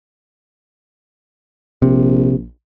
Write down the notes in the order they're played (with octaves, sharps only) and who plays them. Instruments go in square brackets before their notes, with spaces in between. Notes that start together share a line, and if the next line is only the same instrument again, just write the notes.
[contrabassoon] A#1 [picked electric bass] C3